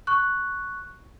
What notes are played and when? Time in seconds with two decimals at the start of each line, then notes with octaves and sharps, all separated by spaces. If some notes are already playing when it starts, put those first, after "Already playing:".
0.07 C#6 F#6